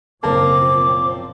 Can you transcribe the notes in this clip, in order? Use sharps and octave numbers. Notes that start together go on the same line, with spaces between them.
F#1 B2 A#3 C4 A#4 A5 D6
F3